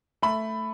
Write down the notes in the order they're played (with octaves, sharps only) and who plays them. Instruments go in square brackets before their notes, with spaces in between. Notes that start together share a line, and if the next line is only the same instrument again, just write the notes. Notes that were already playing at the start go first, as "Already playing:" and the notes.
[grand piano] A3 B5